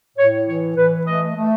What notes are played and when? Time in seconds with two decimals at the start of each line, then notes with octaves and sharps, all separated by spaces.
0.17 A2 C#5
0.46 E3 C#5
0.76 E3 B4
1.06 A3 D#5
1.35 A3